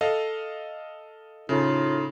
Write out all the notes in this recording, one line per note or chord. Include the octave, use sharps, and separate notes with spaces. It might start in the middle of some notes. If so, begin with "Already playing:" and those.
A4 D#5 F5
A2 C#3 D#4 F4